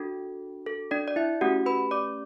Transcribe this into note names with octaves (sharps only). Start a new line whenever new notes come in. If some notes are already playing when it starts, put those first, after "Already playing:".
Already playing: D4 F#4 A4
A4
D4 D5
D5
E4 E5
A3 C#4 F#4 G4 F#5
B4 B5
D5 D6